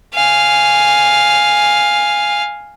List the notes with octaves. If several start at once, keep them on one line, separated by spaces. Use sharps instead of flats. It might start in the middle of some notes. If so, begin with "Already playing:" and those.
F5 G#5